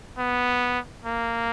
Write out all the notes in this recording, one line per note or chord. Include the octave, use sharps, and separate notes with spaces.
B3
A#3